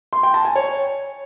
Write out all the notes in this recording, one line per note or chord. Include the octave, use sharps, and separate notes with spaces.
C6
G5
A5
G#5
C#5